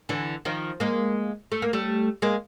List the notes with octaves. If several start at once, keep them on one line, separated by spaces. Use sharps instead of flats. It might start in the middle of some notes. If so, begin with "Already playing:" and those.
D3 E3
D#3 F3
G#3 A#3
A3
A#3
G3 A3
G#3 A#3